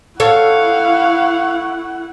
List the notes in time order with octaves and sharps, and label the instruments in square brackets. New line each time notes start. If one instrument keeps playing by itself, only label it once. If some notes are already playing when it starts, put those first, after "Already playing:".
[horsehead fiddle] E4 F#5 [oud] A4 C#5 [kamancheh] F5 [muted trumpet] C#6